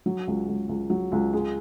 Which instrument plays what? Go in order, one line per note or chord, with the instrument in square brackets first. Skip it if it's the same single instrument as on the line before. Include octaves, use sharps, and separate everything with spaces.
[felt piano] F#3
C#2
C#2
C#2
F#3
C#2
G#3